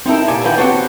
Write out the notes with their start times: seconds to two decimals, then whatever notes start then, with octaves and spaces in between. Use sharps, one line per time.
0.06 C4 D#4 E4 A4 A#4
0.28 A#2 G4 D5 G#5 A#5
0.44 D3 D#3 F4 B4 G5
0.57 C4 F#4 G4 A4 C5 C#5